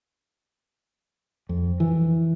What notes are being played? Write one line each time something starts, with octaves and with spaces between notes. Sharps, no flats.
F2
E3